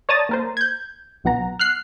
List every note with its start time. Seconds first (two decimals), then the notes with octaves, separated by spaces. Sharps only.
0.09 C#5 D5 A5 A#5 D#6 A6
0.29 A#3 A#4 C5
0.57 G6 G#6
1.24 B1 F#3 B3 F#5 A#5
1.59 F6 F#6 C7